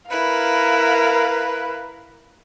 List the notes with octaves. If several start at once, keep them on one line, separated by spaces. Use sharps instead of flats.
E4 A#4 B4 F5